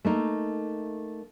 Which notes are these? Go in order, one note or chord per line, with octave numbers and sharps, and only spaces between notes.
A3 A#3 D#4